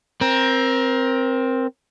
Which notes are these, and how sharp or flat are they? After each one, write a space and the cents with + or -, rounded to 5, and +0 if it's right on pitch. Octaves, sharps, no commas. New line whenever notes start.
C4 +10 A#4 +25